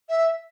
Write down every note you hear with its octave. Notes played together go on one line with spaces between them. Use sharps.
E5